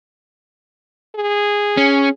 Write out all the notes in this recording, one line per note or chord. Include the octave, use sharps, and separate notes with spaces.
G#4
C#4